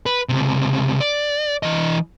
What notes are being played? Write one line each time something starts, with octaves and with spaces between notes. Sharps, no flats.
B4
C#2 C3
D5
E3 D#5